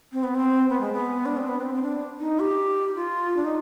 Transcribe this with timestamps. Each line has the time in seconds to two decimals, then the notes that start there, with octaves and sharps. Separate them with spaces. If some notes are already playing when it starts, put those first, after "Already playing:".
0.12 C4
0.24 B3
0.35 C4
0.70 B3
0.81 G#3
0.93 B3
1.26 D4
1.37 C4
1.49 B3
1.60 C4
1.74 C4
1.83 D4
2.20 D#4
2.40 G4
2.96 F4
3.36 D4
3.45 D#4